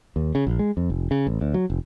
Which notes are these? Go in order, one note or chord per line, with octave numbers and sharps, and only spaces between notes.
D#2
C#3
A#1
G#3
F2
F1
C#3
A1
D2
F#3
F1